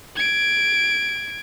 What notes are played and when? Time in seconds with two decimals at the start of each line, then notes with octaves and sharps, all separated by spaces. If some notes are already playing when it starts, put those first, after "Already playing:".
0.16 G#6 D7